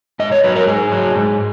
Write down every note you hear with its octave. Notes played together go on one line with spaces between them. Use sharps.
G#2 D#5
C#5
F#3 B4
A#4
G#2 G#4
F#3
G#2